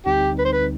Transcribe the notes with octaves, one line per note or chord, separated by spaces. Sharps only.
D2 D3 G3 C4 D#4 G4
B4
C5
B4